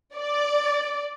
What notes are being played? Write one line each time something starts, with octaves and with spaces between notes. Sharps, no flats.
D5